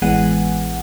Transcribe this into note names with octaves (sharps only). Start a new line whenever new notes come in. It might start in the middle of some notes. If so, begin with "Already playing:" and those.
A1 E3 G#3 B3 F#5 G#5